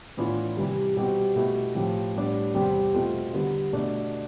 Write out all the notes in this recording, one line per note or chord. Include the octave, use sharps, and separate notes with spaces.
A2 E3 B3 D4 F4
C3 E3 G3
B2 G3 C4 G4
B2 A3 E4 G4
A2 F3 C4 G4
A2 G3 B3 D4
E2 C3 G3 C4 G4
B2 A3 C4 F4 A4
D3 G3 B3
B2 A3 D4